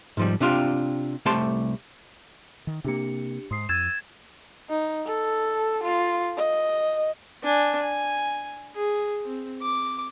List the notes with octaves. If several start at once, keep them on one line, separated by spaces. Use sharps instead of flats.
G#2 F3 G3
C3 D4 F4 G4
C2 A3 G4 C5 A5 C6
D#3
C3 A#3 D4 G4 C#7
G#2 C6 D#6 C7
F2 E6 G#6 A6 D#7 E7
D#4
A4
F4
D#5
D4 G#5
G#5
G#4
C4
D6